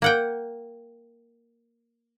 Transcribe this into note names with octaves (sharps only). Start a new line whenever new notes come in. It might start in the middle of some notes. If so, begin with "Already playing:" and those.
A#3 F#5 G5